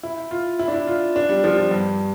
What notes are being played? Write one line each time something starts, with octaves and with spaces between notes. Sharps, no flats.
E4
F4
E4
D4
E4
F4
D4
G3
F3
F3
G2